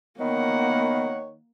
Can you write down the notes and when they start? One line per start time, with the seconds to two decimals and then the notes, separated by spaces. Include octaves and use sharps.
0.20 D#3 A#3 B3 C#5 F#5